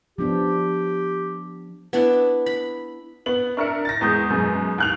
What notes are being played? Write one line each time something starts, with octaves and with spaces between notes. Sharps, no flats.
F3 B3 D4 G4
B3 D4 E4
B5
B3 F#7
D4 A#4 E5 C#7
A6 A#6
E2 G#3 D#6 G6
F#2 B2 G#3
D#2 F#6 F7